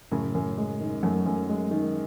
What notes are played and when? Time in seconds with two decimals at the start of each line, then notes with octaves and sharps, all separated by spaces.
0.12 F#2 A2 C#3
0.35 F#2
0.58 G#3
0.81 D#3
1.03 F#2 F#3 A3
1.26 F#2
1.49 G#3
1.71 D#3